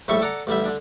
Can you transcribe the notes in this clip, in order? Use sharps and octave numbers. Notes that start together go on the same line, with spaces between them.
A#1 A2 G3 A4 E5 C#6
A4 D5 F#5 A5 A#5
A1 D3 G3 E5
D3 D4